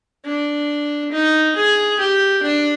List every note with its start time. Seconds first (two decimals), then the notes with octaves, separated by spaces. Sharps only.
0.25 D4
1.12 D#4
1.56 G#4
1.99 G4
2.42 D4